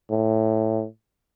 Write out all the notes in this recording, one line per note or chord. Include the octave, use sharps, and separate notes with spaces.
A2